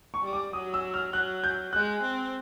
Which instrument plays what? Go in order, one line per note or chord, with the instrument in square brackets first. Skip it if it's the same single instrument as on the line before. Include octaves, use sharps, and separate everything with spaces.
[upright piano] C#6
[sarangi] G3
[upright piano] D6
[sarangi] F#3 [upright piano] D#6
[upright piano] E6
F6
[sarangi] F#3 [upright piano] F#6
[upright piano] G6
[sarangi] G#3 [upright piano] F#6
[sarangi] C4